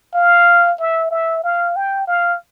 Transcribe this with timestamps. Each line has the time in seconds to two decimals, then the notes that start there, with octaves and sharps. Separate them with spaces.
0.14 F5
0.80 E5
1.11 E5
1.44 F5
1.76 G5
2.07 F5